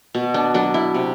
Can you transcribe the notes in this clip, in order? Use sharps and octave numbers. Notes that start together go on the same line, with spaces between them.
B2
D4
F#3 D4
E4
C3